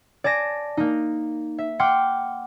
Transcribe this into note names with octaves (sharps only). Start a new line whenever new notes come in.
D5 G#5 A5 A#6
A#3 D#4
E5
F#5 G5 C6 D6 F6